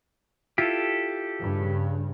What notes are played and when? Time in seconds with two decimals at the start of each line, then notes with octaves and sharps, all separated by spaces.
0.58 E4 F4 G4 A4
1.40 G2 C#3